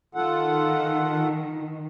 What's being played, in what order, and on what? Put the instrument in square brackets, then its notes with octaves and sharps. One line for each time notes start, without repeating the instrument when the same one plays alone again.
[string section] D#3 [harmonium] F4 A4 F#5